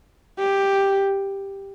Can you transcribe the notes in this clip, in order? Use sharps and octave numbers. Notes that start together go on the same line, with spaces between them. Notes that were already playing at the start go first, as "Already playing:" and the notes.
G4